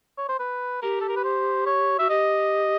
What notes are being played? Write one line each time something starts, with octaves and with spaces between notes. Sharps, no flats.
C#5
C5
B4
G4 A#4
A4
A#4
B4
C5
C#5
F#4 E5
G4 D#5